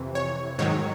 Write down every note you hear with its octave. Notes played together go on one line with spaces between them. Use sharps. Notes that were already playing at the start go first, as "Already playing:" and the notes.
Already playing: F2 C3 E3
C#5
G#2 D#3 F#3 C#5